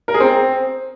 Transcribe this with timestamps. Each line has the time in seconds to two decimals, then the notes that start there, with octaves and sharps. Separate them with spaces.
0.08 A#4
0.14 G#4
0.20 C4